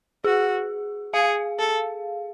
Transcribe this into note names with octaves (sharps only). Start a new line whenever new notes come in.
F#4 G#4
G#4 F5
A4